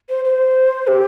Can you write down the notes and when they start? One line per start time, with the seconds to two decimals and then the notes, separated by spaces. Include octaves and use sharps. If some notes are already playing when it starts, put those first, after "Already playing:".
0.09 C5
0.25 C5
0.87 G4